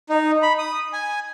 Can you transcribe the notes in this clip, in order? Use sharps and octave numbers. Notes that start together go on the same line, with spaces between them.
D#4
B5
D#6
G#5